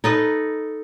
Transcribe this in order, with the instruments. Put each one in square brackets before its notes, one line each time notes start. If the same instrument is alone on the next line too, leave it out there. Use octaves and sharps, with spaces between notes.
[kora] D#4 A4 B4 D#5